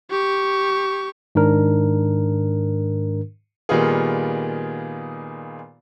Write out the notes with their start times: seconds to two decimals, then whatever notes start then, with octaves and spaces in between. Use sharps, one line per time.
0.11 G4 C#6
1.35 G#2 D#3 D4 A#4
3.69 A#2 D#3 G3 B3 F4 G#4